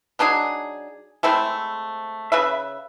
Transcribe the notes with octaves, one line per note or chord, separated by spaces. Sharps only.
F#3 D4 D#4 G#4
G#3 A3 C4 E4
C#3 B4 E5